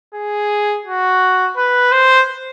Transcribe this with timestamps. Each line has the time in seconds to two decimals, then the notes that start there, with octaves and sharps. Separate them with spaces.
0.15 G#4
0.85 F#4
1.57 B4
1.92 C5